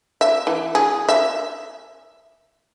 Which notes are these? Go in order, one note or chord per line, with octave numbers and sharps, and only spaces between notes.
E5
E3
G#4
E5